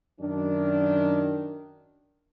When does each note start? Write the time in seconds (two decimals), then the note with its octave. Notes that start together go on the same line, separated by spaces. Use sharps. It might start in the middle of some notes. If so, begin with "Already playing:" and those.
0.20 F#2 D#3 D4